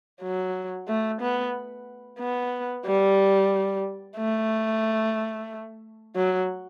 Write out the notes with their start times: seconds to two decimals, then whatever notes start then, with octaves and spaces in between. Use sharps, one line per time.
0.22 F#3
0.88 A3
1.21 B3
2.19 B3
2.86 G3
4.17 A3
6.15 F#3